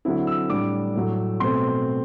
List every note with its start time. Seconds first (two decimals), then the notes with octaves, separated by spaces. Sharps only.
0.05 D3 F#3 C4 E4
0.27 E6
0.50 A2 G3 D4 D6
0.95 A2 F#3 A3
1.40 B2 A3 C4 C6